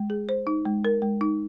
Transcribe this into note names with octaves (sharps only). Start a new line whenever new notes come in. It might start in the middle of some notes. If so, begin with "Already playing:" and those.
Already playing: G#3
G#4
C5
D#4
G#3
A#4
G#3
D#4